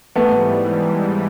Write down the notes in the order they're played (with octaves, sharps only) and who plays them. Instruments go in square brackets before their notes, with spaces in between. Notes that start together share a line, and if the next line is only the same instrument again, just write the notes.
[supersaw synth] G#2 E3 G3 [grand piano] A3 B3